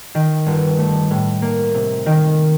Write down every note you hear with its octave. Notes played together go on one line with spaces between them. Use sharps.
D#3
G1
A3
A2
A#3
C3
D#3